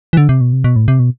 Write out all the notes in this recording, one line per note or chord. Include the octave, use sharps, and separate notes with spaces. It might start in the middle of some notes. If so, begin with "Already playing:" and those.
E3
D3
C3
B2
C3
B2
A2
C3
B2